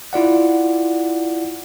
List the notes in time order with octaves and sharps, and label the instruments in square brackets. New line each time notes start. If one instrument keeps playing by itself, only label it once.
[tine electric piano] E4 F4 D5 F#5